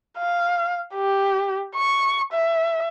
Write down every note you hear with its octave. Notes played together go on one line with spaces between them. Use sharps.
F5
G4
C#6
E5